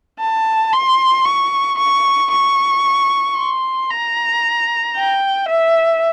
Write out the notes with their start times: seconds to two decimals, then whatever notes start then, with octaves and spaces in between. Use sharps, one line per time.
0.20 A5
0.72 C6
1.25 C#6
1.78 C#6
2.31 C#6
3.37 C6
3.91 A#5
4.96 G5
5.48 E5